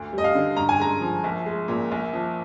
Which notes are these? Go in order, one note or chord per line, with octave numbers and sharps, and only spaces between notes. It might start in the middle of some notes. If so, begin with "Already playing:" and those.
Already playing: D2
G3
D#5
F5
D3
G2 A#5
G#5
G#3 A#5
F3
A#1
G#3
A#2
A#1
F3